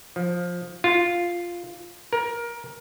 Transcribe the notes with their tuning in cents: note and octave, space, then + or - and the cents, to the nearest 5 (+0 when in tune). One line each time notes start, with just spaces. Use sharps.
F3 +15
F4 +0
A#4 +20